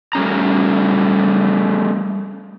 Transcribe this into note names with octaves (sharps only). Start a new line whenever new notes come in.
G3 A3 C#4 A#5